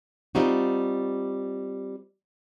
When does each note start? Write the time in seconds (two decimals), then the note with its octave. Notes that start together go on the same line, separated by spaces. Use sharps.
0.35 G3 C4 D#4 F4 F#4